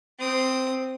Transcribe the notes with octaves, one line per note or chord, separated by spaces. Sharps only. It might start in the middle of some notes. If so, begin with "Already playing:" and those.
C4 D#6